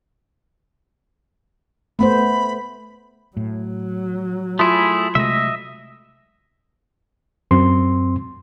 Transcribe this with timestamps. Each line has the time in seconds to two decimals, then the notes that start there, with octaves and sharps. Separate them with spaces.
1.99 A3 B3 C5 B5
3.37 A2 F#3
4.59 A3 E4 F4 G#4 C6 D#6
5.15 C3 G#3 A3 D#5 E5
7.51 F#2 C4 C6